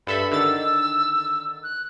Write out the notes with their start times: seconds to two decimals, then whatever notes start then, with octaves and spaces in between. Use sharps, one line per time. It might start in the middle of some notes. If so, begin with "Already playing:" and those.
0.07 G2 A4 E5 B5
0.31 D3 D#3 E6 A6
1.63 F#6